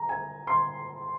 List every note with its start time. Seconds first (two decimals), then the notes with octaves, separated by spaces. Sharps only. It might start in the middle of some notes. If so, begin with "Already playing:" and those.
Already playing: A#5
0.09 G#5
0.47 C6